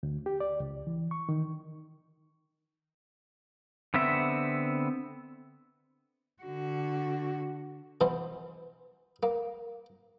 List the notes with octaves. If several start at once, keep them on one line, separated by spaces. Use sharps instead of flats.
D2
G4
D5
C#2
E3
C#6
D#3
D3 B3 C4 E5
D3 F#4
B2 E3 C5
A#3